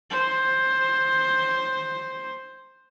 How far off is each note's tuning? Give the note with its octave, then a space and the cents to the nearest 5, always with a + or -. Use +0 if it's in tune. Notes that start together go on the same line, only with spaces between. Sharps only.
C5 +10